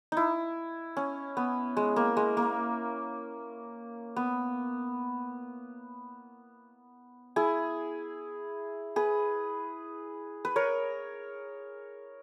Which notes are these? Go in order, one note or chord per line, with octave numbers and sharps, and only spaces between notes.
D#4 E4
C#4
B3
G#3
A#3
G#3
A#3
B3
E4 G#4
G#4 B4
B4
A#4 C#5